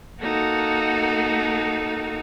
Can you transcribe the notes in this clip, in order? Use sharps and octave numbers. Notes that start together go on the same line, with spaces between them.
A#3 D#4 F#4 A4